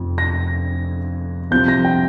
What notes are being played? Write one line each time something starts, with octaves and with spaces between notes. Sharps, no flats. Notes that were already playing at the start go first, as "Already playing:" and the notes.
Already playing: F1 F2 F3
A#6
C2 C3 F3 G6
A#6
G5